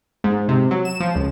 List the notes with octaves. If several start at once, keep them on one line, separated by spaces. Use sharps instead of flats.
G#2
C3
F#3
E7
F3
C#2